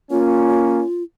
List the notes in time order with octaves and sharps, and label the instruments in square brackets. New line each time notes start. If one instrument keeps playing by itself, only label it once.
[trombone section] A#3 C#4 [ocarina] F4